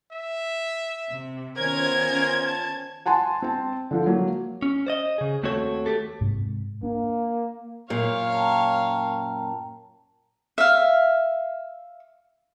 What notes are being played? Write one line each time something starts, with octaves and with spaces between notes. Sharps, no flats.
E5
C3
D#3 B3 C#4 F4 A#4 C5 G#6
A5
F#5 G#5 A5 C6
C4 A5
D3 F3
F#3 A#3
C#4
C5 D5 D#5
C#3 G#4
D#2 A3 C4 F#4 A4 C#5
A3 G4 A4
G#2 C3
A#3 D4
F#2 A#2 C#5 F5
G5 A5 A#5
E5 F5